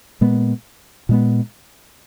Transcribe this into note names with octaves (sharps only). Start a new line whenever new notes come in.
A#2 G#3 B3
A#2 G#3 B3